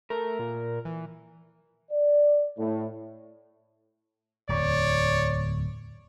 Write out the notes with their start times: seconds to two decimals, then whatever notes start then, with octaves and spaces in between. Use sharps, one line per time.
0.10 A3 A#4
0.39 A#2
0.85 E3
1.91 D5
2.58 A2
4.49 D1 E2 C#5 D5